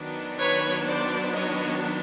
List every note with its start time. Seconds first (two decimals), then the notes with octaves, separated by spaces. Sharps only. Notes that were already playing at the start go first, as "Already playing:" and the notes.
Already playing: D#3 F#3 B3 D4
0.38 B4 C#5
0.86 C5 D5
1.33 C#5 D#5